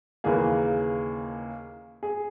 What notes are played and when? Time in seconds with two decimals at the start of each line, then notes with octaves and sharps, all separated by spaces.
0.24 D#2 C#3 E3 A#3 G#4
2.03 G#4